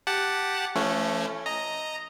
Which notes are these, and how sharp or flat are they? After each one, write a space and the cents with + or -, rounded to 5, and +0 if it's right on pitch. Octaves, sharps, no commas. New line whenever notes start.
G4 +0 F#5 +0 A5 +0
F3 -45 A3 +0 C#4 +0
D#5 +0 A#5 -5